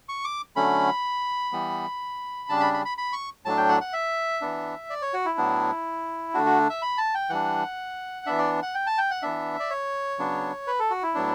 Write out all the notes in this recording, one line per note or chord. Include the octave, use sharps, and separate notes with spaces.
C#6
D6
D3 F#3 A3 C#4 B5
E3 G3 B3
C#3 G3 D4 A5
B5
B5
B5
B5
C#6
A2 F#3 A3 D4 A5
G5
F#5
F#5
E5
E3 B3 D4
D5
C#5
F#4
E4
A2 F#3 B3 D4
D3 A3 D4 F#4
F#4
E5
B5
A5
G5
E3 G3 D4 F#5
E3 B3 D4 E5
D5
F#5
G5
A5
G5
F#5
E3 B3 D4 E5
D5
C#5
C#3 F#3 B3 D4
B4
A4
F#4
E4
A2 F#3 B3 D4